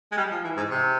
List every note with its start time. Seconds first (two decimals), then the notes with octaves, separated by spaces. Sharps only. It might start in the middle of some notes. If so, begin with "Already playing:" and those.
0.12 G#3
0.17 G3
0.31 F3
0.44 E3
0.57 G#2
0.71 C3